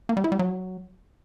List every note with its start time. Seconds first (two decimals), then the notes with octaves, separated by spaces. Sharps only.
0.09 A#3
0.17 G3
0.24 E4
0.32 G3
0.39 F#3